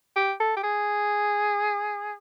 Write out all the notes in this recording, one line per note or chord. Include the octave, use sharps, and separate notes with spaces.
G4
A4
G4
G#4